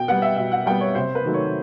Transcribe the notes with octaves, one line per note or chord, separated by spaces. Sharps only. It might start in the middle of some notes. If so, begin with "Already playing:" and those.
Already playing: B2 G5
G3 B3 F#5
E5
B2 E5
F#5
G3 B3 G5
C#5
C3 C5
B4
D#3 F#3 A3
C#5